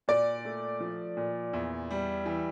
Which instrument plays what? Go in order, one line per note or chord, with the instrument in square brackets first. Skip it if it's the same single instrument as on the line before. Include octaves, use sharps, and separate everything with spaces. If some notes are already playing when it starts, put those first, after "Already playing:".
[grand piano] A#2 [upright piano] D5
[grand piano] A3
F3
A#2
E2
G3
E3